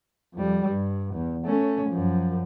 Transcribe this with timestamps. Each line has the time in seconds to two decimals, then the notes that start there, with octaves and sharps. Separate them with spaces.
0.34 F2 G3
0.68 G2
1.14 E2
1.46 A3 C#4
1.89 F#2 F3